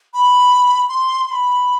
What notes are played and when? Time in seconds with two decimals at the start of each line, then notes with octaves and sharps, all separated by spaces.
0.14 B5
0.89 C6
1.27 C6
1.31 B5